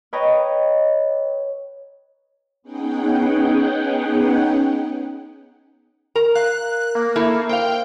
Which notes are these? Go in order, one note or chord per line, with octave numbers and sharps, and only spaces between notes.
B4 C#5 D#5 G5 A#5
B3 C#4 D#4 G#4 F#5 G5
A#4 A#5
F5 F#6
A#3
A3 E4 A5
C5 F5 G5